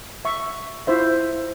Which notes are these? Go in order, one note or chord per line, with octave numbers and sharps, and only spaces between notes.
E5 C#6
E4 F4 C5 E5